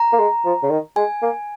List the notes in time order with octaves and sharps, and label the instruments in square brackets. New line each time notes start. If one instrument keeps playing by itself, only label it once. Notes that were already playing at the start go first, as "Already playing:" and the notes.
Already playing: [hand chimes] A#5
[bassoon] A#3
G#3
F3
C#3
D#3
[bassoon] G#3 [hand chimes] G#5
[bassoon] A#3